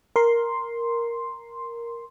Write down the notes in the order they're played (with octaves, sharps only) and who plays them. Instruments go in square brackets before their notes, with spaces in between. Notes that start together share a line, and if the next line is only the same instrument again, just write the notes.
[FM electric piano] A#4 C6